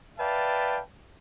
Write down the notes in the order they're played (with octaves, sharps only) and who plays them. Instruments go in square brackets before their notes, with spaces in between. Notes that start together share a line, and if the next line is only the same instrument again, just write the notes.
[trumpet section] B4 D5 E5 F5 G5 A5